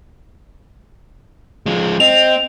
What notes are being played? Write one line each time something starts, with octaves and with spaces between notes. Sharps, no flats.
F3 G#3
C4 D#5 F7